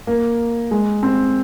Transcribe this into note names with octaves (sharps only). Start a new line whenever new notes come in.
A#3
G#3
C4